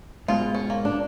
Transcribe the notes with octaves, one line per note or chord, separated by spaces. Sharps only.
G#2 B2 F4
C#4
A#3
D4